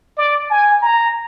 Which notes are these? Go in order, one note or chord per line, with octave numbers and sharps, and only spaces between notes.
D5
G#5
A#5